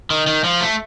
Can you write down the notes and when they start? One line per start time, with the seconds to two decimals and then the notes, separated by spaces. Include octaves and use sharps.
0.10 D#3
0.27 D#3
0.44 F3
0.61 A3